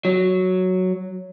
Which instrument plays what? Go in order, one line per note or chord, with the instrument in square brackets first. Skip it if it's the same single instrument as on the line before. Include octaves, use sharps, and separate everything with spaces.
[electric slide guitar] F#3